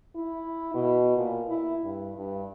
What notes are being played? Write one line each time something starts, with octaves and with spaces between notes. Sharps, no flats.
E4
B2
A#2
E4
G2
G2